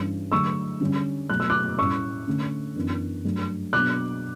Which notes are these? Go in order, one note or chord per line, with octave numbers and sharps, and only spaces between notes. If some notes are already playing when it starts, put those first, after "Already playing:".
Already playing: G2 E3 G3 C#4
D3 F#3 A3 D4 C#6 E6
D3 G3 C#4
B2 F#3 A3 F#6
E6
D6 F#6
A2 G3 C#4 C#6 E6
D3 A3 C#4
F#2 E3 B3 D4
G2 F#3 A3 D4
B2 F#3 B3 D4 D6 F#6